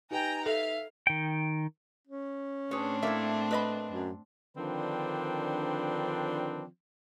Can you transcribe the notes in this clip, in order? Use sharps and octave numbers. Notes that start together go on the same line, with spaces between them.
D#4 G4 B4 G5 G#5 A#5
A4 E5 F5
D#3 G5
C#4
A2 C4 D4 G#4 B4 C#5
A3 A#3 E4 E5
B4 D#5 B5
F#2
D3 D#3 F3 C4 D4 B4